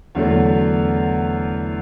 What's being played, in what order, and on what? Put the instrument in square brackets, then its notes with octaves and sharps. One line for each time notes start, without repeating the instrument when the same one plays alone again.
[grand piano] E2 D3 F#3 A3